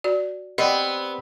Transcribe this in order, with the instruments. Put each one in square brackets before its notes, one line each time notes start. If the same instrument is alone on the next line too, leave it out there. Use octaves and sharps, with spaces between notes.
[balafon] F#4 D5
[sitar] B3 [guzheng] C4 [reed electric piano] G4 D5 [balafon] D#5